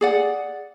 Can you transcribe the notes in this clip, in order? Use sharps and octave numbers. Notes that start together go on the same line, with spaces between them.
G#4 D5 F#5